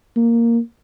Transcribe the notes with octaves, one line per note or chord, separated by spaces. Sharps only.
A#3